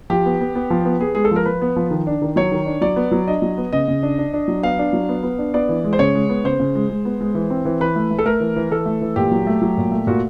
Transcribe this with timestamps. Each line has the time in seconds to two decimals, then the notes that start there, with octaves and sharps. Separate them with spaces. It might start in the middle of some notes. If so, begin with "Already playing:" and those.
0.10 F3 G4
0.26 B3
0.41 B3
0.55 B3
0.70 F3
0.85 B3
1.00 B3 G#4
1.15 G#3 G#4
1.25 A4
1.31 F3 A#4
1.45 F3 B4
1.62 B3
1.76 F3
1.91 D#3
2.07 D4
2.22 D#3
2.36 F#3 C#5
2.52 D#3
2.66 D4
2.81 F#3 D5
2.96 B3
3.11 F#3
3.28 D4 D#5
3.42 F#3
3.57 B3
3.73 C#3 D#5
3.88 C#3
4.03 D4
4.18 D4
4.34 D4
4.48 F#3
4.63 B3 F5
4.79 D4
4.93 F#3
5.09 B3
5.23 B3
5.39 D4
5.54 B3 D5
5.69 E3
5.84 G#3
5.93 C5
5.99 C#3 C#5
6.15 G#3
6.29 B3
6.44 C#3 C5
6.60 C#3
6.75 G#3
6.89 G#3
7.05 B3
7.21 G#3
7.35 E3
7.50 C4
7.65 E3
7.80 E3 B4
7.96 A3
8.11 A3
8.19 A4
8.26 A3 A#4
8.40 E3
8.56 E3
8.71 E3 A4
8.86 A3
9.01 E3
9.16 A#2 G4
9.31 F#3
9.47 A3
9.62 F#3
9.78 A#2
9.91 A3
10.07 A#2 F#4